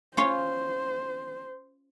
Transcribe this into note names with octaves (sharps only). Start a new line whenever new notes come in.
C#4 F4 C5 C#5